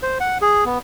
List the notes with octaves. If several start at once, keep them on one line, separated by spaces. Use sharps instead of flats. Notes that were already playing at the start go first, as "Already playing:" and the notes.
C5
F#5
G#4
B3